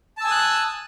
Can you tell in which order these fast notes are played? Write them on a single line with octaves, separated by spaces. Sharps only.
A5 E6 G#5 D#6 F#6